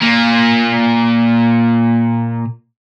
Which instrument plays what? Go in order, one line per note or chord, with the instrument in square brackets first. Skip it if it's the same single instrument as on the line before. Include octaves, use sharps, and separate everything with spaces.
[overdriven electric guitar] A#2 A#3